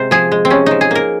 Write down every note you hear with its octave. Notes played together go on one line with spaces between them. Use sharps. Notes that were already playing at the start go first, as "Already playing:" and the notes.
Already playing: C3 G#3 C5
F3 G#4
G#3
C4
C3 C#4
F3 D#4
G#4
A#3 A#4